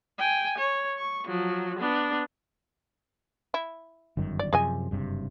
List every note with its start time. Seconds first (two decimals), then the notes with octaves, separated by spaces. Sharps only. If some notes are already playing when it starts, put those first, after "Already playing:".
0.19 G5 G#5
0.58 C#5
0.97 C#6
1.26 F3 F#3
1.79 B3 D4
3.54 E4
4.17 G1 F#2 D#3
4.39 D5
4.53 F#2 C3 F3 G#4 D#5 G#5
4.91 F#1 G2 C3